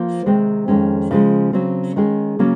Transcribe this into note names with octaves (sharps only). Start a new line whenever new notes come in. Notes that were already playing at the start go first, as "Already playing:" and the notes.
Already playing: F3 A#3 F4 C5
C3 D#3 G#3 C4
F2 D#3 G#3 C#4
C#3 F3 G#3
C#3 F#3 C4
D#3 G#3 C#4 G#4
C#3 F#3 A#3 C#4